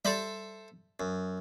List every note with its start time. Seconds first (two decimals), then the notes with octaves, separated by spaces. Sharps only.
0.05 G3 A4 C5 D5 E5
1.00 F#2